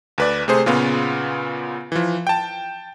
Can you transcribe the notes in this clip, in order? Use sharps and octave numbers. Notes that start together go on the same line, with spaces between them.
D2 B4 D5
C3 A3 G#4 C5
A#2 C#3 B3 F4
E3 F3
G5 A5